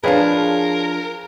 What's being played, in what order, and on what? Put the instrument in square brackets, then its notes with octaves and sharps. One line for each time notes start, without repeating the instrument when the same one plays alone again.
[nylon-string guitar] F3 D4 [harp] G#4 [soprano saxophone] A#4 [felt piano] B4 C#5 F5